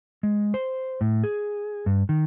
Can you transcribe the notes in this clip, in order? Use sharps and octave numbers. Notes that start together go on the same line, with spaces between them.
G#3
C5
A2
G#4
G2
D#3